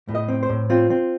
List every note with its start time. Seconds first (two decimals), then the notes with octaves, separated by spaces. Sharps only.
0.09 A2
0.15 D#5
0.28 C4
0.43 C5
0.49 A2
0.70 C4 F4
0.90 C4